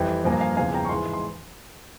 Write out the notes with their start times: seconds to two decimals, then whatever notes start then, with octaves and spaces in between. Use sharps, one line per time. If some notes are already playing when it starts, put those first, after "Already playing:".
Already playing: F2 E3 G3 E5 G5
0.25 G2 F3 A#3 G#5
0.33 A#5
0.41 F5 G#5
0.57 E2 C#3 F3 F5 G#5
0.74 G5 A#5
0.85 C#6
0.89 G#2 E3 G#3 G#5 C6
1.13 C6